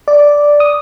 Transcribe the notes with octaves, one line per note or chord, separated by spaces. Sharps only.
D5
D#6